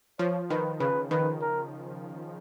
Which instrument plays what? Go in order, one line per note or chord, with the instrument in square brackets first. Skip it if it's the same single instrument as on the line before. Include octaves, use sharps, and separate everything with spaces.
[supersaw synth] F3 [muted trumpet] C#5
[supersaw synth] D#3 [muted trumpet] B4
[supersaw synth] C#3 [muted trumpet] B4
[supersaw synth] D#3 [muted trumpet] B4
[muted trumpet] A#4